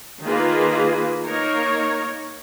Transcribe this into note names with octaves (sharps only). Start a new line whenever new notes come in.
D#3 A#3 F4 G#4 B4
A#3 D#4 A#4 C#5